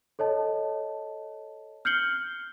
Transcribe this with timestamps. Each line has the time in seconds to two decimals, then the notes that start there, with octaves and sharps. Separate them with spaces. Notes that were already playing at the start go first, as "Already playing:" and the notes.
0.19 A4 C#5 D#5 A5
1.85 F6 G6 C7 C#7 F#7 G7